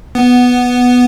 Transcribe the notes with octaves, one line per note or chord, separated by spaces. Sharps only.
B3